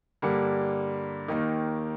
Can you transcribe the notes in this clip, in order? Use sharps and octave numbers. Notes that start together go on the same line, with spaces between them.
G2 D3 G3 A#3
D#2 D#3 A#3 D#4